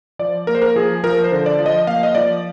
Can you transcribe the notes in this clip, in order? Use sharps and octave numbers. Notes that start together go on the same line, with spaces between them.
F3 D5
A#3 A#4
C5
A#4
F3 G#4
F3 A#4
C5
D3
D5
F3
D#5
A#3 F5
D#5
F3 D5